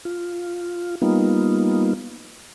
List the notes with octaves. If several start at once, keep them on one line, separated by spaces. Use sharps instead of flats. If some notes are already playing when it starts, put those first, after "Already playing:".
F4
G3 A#3 B3 D#4 F4